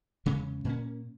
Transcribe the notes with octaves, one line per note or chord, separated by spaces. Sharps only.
E2 C#3 G#3 C#4
A#2 A#3 C#4